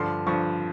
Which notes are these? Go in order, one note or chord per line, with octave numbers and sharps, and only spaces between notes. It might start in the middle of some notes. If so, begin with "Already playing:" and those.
Already playing: G2 D3 F3 C6
G2 D3 F3 C#6